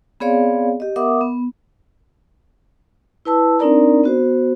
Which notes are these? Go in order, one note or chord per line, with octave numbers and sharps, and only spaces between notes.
B3 C4 G#4 C#5 D5 F5
G4 D#5
B3 A#4 E5 F#5 D6 D#6
B3
E4 B4 A5 E6
C4 D4 D#4 A#4 D5 A#5
B3 F#4 C5